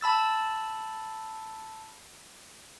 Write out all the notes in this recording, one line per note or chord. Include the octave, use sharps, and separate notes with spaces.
A5 B5 E6 A6